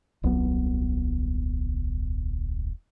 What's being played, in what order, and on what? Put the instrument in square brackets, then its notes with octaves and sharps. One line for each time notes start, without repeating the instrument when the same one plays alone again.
[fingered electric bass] D#1 C2 F#3 B3